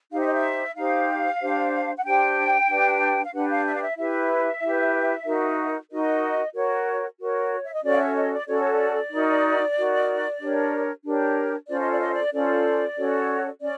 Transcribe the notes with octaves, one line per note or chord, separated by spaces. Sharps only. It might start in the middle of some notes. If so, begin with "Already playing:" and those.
D#4 G4 C5 F5
E5
D#5
E5
D#4 G4 C5 F5
D4 G4 C5
F#5
D4 G4 C5 G5
D4 G4 B4
F5
D4 G4 B4 F#5
F5
E5
F5
E5
E4 G4 B4 E5
E4 G4 B4
D#4 F#4 A#4
D#4 F#4 A#4 D#5
F#4 A#4 C#5
F#4 A#4 C#5
E5
D#5
C#4 F#4 A4 C#5 D5
F5
E5
D#5
D5
C#4 F#4 A4 C#5 D5
C#5
D5
D#4 F#4 A#4
D#4 F#4 A#4
D4 G4 A#4 C#5
D4 G4 A#4 C#5
C#4 F4 A4 C5 D5
D#5
D5
D#5
D5
C#4 F4 A4 C5 D5
C#4 F#4 A4 C#5
C#4 D5